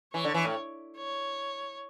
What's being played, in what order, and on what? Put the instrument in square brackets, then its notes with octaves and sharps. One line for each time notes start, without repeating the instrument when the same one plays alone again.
[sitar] E3 [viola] C#5
[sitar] D3
E3
A2
[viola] C#5